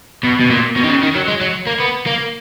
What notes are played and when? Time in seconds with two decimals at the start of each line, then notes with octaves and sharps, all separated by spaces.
0.25 B2
0.41 B2
0.51 A#2
0.76 B2
0.84 D#3
0.89 C#3
1.03 D#3
1.15 F#3
1.28 G#3
1.41 F#3
1.67 A#3
1.80 B3
2.06 A#3